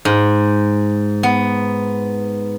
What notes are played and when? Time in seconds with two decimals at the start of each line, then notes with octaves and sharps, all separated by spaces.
0.05 G#2
1.23 B3